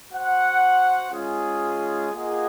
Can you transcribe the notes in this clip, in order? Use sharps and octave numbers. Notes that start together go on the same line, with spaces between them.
F#4 C5 F#5
G#3 C#4 F4 G#4
A#3 F4 G#4 D#5 F#5